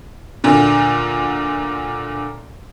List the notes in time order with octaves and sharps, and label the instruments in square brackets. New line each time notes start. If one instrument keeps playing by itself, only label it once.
[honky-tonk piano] D2 A#2 D3